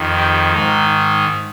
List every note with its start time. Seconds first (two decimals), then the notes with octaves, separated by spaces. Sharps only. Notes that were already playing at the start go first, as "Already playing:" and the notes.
Already playing: F2 D#3
0.17 G4
0.52 G#2 D#3 D#4